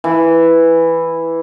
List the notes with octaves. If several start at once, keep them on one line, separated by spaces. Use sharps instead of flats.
E3